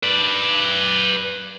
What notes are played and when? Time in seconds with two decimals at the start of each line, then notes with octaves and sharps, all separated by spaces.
0.03 B4 D5